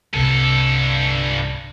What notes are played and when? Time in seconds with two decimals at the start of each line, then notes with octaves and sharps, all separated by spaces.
0.14 C2 G2 C3 A4